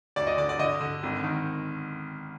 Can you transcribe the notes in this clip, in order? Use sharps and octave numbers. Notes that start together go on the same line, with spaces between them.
D2 D5
D#5
D3 D5
D5
D3 D#5
D3
G#1
D#3